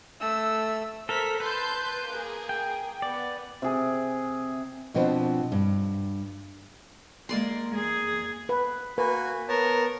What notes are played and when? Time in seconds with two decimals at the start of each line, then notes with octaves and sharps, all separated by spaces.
0.20 A3 E6
1.09 A4 A#4 C5 B6
1.40 B4 A5 C6 G6
2.09 A#3 G#4
2.49 G5
3.02 B3 D5
3.62 C3 G#4
4.94 B2 F3 B3 C4 D4
5.52 G2
7.29 G#3 A#3 D5 C6
7.75 G#4
8.49 B4
8.98 A#3 F#4 B4 G#5
9.48 B3 A#4 C#5 A5